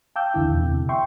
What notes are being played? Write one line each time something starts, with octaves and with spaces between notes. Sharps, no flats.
F5 G5 A5 D6 E6 G6
E2 D3 E4
E2 B2
C3
E5 G5 C6 C#6